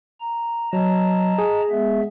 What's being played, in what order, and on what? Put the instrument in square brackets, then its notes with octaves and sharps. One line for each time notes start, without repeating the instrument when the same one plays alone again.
[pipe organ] A#5
[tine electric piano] F#3 [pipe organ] D#5 A5 A#5
[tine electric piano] G#4
[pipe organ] G#3 B3 E5